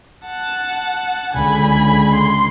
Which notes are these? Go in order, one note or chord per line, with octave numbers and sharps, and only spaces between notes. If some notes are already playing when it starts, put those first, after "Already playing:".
F#5 A5
C#2 D3 G#5 B5
C6